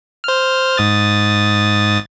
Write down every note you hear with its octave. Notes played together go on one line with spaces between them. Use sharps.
C5 F6
G#2 D#6 A6